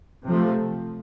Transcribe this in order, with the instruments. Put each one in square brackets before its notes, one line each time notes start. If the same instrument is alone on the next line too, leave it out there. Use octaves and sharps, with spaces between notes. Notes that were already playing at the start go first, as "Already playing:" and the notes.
[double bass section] C3 F3 A3